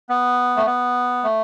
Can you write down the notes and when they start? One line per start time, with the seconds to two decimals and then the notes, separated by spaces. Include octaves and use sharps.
0.09 B3
0.57 A3
0.66 B3
1.24 A3